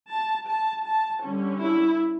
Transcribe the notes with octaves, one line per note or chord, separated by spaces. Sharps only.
A5
A5
A5
D3 G3 C#4
E4